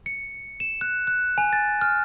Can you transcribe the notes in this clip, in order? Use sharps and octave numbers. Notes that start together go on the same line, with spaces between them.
C#7
E7
F#6
F#6
G#5
A6
F6